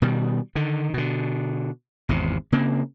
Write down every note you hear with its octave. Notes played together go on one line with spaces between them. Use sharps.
B2 D#3 G3
D3 D#3
B2 D3
G#1 E2 C3
C#3 A#3 C4